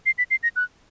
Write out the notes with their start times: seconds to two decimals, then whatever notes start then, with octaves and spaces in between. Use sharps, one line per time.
0.06 C7
0.18 B6
0.31 C7
0.43 A#6
0.56 F#6